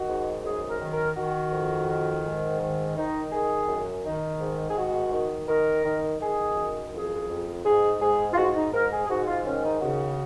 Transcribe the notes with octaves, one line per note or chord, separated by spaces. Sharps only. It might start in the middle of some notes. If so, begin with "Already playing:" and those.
Already playing: D#3 F#4
G#2
F#2 G#4
A#4
D#3
A#4
D#3 F#4
F2
D#3
G#2
D#3
D#3 D#4
D#3 G#4
F#2
D#3 D#4
G#2
G#4
D#3 F#4
D#3
D#3 A#4
D#3
D#3 G#4
F#2
F2 G#4
F2
G#2 G#4
G#2 G#4
F4
G#2 F#4
D#4
G#2 A#4
G#4
G#4
G#2 F#4
F4
D#3 C#4
D#4
C#3 F#4